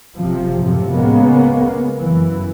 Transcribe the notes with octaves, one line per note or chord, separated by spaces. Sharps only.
F#1 C3 F3
F#2 A2 C3 F3
C#2 C#3 G#3 A#3 B3
F#2 E3